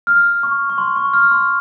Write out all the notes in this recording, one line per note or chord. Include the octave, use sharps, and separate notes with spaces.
F6
C#6
C#6
C6
C#6
F6
C6